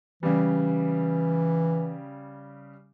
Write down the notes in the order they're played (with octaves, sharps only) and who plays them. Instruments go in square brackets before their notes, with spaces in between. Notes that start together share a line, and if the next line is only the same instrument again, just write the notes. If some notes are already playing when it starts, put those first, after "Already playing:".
[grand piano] C#3 G3 [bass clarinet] E3